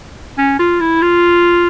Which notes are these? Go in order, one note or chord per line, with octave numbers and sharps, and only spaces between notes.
C#4
F4
E4
F4